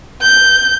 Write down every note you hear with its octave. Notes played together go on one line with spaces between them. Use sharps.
G6